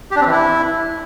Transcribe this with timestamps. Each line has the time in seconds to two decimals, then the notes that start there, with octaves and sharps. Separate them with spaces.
0.11 G4
0.16 D4
0.21 C4
0.26 E3
0.31 E4